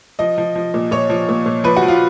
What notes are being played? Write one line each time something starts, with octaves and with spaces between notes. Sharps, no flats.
F3 D#5
F3
F3
A#2
A#2 C#5
F3
A#2
A#2
F3 B4
F#4
F3
F4